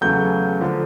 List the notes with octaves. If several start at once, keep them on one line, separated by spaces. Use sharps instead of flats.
E2 C#3 F#3 A3 G6
D3 F3